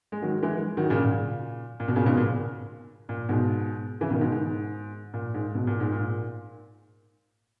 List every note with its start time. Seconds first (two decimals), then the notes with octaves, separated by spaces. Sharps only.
0.12 G#3
0.22 D#3 F#3
0.43 E3 G#3
0.77 D#3 F#3
0.90 A#2 C#3
1.04 A#2
1.80 A#2
1.88 B2
1.96 A#2 C#3
2.06 G#2 B2
2.17 A#2
3.09 A#2
3.29 G#2 B2
4.01 C#3 E3
4.10 B2 D#3
4.21 G#2 B2
4.32 G#2
5.14 A#2
5.34 G#2
5.55 B2
5.67 A#2
5.80 G#2
5.92 A#2